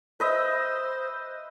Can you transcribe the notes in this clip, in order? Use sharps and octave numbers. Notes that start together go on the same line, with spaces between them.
B4 C5 D#5 E5